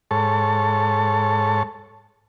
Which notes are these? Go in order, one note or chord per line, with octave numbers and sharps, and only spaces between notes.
G#2 A4 C#5 A5